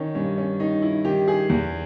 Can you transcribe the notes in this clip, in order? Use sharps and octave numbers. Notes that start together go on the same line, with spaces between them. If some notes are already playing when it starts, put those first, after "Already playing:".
Already playing: D#3 C#4 D#4
G2 C#4
C#4
D#3 D#4
E4
D#3 G4
G#4
E2